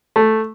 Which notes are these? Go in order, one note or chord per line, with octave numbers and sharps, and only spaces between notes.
A3